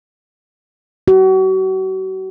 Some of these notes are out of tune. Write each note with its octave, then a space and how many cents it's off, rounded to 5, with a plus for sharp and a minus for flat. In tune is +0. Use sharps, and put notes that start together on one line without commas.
F#4 +35